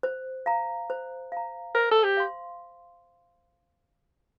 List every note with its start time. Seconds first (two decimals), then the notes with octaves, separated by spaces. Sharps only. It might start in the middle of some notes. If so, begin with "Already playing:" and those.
0.03 C5
0.46 F5 A#5
0.90 C5
1.32 F5 A#5
1.75 A#4 C5
1.91 A4
2.03 G4
2.17 F5 C6